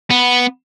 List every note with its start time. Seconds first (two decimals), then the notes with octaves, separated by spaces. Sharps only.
0.10 B3